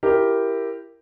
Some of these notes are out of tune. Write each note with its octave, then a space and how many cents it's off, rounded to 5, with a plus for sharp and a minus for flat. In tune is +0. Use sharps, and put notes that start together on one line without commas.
E4 +20 G4 +0 A#4 +0